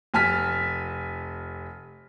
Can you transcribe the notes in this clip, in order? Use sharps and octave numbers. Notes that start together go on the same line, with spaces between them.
F1 G#5 A5 F6 B6